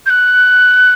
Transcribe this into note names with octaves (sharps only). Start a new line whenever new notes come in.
G6
F#6